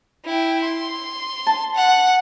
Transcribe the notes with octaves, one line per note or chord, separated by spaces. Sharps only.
E4 G5
C6
A5
F#5